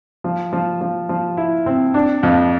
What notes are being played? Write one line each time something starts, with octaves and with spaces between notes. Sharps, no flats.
F3
F3
F3
F3
E4
C4
D4
F2